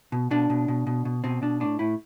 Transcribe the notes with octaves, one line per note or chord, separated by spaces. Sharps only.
B2
B2 D4
B2
B2
B2
B2
B2 C4
B2 D4
A2 D4
A2 E4